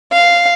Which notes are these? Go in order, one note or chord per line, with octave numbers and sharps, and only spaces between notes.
F5